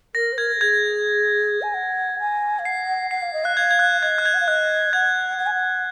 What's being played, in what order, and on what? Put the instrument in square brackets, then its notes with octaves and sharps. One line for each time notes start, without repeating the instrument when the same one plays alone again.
[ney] A#4 [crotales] A#6
[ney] C5
[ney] A#4 [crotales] G#6
[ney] A#4
[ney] G#4 [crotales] G#6
[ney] G#5
F#5
G#5
F5
[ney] F#5 [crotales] C7
[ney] F#5 [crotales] C7
[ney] F5
D#5
[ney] F5 [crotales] F#6
[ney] F5 [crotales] G#6
[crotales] G#6
F#6
[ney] D#5 [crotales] G#6
[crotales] F#6
G#6
[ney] F#5
F5
[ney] D#5 [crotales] F#6
[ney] F#5 [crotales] G#6
[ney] F#5
G#5
F#5